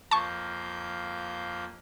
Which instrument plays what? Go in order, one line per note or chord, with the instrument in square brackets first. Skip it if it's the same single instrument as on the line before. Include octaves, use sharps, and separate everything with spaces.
[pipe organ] F2 A#3 G6 [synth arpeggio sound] A5 C#6